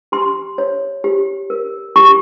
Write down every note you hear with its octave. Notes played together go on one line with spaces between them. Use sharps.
G4 C6
C#5
G4
A#4
G4 C#6